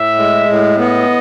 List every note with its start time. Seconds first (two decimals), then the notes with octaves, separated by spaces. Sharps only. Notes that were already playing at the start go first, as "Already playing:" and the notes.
Already playing: A2 E5
0.18 G#3
0.49 A2
0.79 B3 D#5